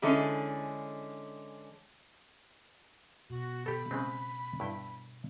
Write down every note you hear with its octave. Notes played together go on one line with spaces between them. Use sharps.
D3 E3 G#3 C#4 A4
B2 F#4
G4 A4 B5
C#3 G#3 C4
G2 E4 G5